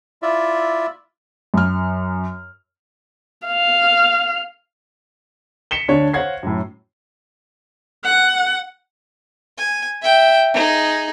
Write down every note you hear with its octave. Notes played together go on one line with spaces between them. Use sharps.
E4 F4 D5 E5
F#2 F6
F5
B6 C#7 E7 G7
D2 D4 C#5 D5
C5 C#5 F5 F#5 G#6 C7
F#2 A2
F#5
G#5
E5 G5
D#4 G#4